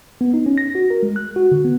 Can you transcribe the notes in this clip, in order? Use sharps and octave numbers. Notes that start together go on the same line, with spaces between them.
B3
D#4
C#4
A#6
F#4
A#4
G#3
F#6
F#4
D3
B3